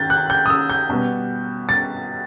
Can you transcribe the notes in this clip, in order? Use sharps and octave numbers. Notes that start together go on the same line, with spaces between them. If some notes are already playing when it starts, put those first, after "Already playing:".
Already playing: D#3 G6 A6
F#6
G6
D#6
E6
G6
B2 G3 B3
A6